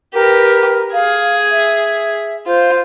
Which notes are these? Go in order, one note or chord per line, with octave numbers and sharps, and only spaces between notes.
G4 A#4 B4
G#4 F5
E5
F4 C5